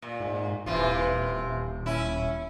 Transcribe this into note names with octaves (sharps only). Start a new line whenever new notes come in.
A#2
G#2
D#1 C3 E3 F4
C#4 E4